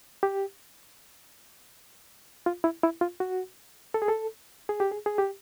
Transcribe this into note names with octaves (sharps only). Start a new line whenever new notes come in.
G4
F4
E4
E4
F4
F#4
A4
G#4
A4
G#4
G4
G#4
G#4
G4